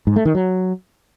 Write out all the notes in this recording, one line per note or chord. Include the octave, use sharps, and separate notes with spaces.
G#2
A3
D#3
F#3